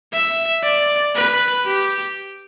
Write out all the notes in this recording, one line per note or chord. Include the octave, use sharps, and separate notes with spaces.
E5
D5
B4
G4